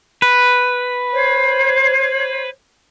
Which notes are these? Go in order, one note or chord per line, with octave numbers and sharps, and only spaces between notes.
B4
C5 C#5